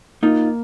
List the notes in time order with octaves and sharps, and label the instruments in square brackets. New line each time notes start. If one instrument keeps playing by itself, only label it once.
[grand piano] A#3 [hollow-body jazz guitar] D#4 F4